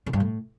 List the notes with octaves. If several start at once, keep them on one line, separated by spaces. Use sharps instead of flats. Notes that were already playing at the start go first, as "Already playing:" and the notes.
C#3
G2
A2